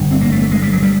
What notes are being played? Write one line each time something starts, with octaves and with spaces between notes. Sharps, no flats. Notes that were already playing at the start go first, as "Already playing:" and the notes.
Already playing: G1 G2 D3
C4
A#3
A3
A3
G#3
G3
F#3
G3